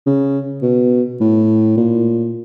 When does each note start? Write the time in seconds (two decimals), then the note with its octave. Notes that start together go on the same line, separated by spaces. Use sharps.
0.06 C#3
0.62 B2
1.20 A2
1.77 A#2